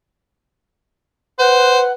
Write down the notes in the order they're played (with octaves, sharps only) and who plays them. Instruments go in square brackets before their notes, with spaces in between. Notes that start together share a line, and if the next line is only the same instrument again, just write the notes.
[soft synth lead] B4 [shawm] C5 [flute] F#5